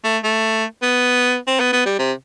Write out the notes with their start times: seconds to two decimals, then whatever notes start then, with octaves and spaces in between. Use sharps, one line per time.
0.04 A3
0.24 A3
0.83 B3
1.48 C4
1.60 B3
1.73 B3
1.86 G3
1.99 C3